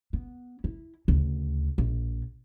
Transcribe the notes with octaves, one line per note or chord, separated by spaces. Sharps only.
B3
E4
D2 C#3
A#1